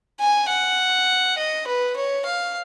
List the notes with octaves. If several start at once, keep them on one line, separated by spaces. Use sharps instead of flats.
G#5
F#5
D#5
B4
C#5
F5